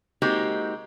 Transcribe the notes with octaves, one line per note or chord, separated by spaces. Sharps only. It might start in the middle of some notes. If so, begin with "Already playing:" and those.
G#3 A#3 C4 D#4 F#4 G4